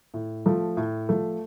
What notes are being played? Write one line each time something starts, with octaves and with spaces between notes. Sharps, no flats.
A2
F3 A3
A2
F3 A3